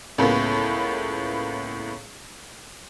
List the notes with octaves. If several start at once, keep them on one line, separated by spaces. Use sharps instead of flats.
C#2 A2 A#3 B3